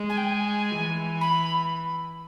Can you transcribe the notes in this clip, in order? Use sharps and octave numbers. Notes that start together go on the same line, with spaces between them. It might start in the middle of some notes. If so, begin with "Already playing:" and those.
Already playing: G#3
G#5
G5
G#5
E3
B5